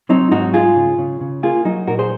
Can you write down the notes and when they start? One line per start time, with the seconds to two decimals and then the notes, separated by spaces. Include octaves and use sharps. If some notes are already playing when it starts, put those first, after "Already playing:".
0.09 F#3 C4 D#4
0.31 G#2 D#4 F#4
0.54 G#3 F4 G#4
0.76 C#3
0.98 C#3
1.21 C#3
1.43 A#3 F4 G#4
1.65 F#3 D#4 F#4
1.87 A#2 F#4 A#4
1.99 G#4 C5